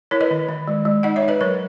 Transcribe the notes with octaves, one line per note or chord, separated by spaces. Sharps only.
E4 A#4 C#5
B4 D#5
D#3
D#3
G#3
G#3
D#4 D#5 F#5
C#5 E5
D#4
B4 D#5
F#3 A#4 C#5